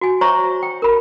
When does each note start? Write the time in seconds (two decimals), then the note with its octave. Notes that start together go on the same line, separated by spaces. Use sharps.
0.01 F#4 G#5
0.21 C5 C#5 E5 A#5 C#6
0.63 G5
0.82 A#4 B5